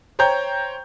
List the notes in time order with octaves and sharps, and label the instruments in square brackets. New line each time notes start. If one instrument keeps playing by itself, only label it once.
[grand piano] C5 C#5 G5 A#5 G6